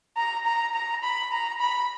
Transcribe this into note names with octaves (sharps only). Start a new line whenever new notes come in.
A#5
A#5
A#5
B5
A#5
B5